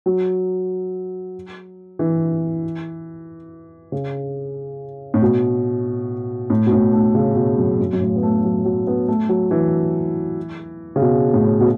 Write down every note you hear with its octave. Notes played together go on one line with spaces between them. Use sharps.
F#3
E3
C#3
A2
B2
A2
B2
A2
A3
C#3
B2
F#2
F#2
F#2
A2
B3
A3
F#3
F#3
B3
A3
F#3
E3
C#3
B2
A2
B2